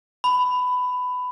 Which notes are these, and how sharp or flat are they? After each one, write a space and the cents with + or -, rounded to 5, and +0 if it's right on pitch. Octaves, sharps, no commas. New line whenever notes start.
B5 +15